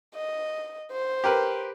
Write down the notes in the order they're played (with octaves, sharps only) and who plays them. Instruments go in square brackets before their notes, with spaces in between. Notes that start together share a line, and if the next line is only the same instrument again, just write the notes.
[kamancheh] D#5
C5
[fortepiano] G4 A#4 B4